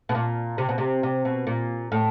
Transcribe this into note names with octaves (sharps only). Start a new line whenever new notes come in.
B2
A#2
C3
B2
C3
C3
B2
A#2
A2